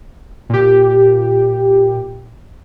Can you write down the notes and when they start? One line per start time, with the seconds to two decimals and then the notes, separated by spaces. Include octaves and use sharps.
0.49 A#2 G4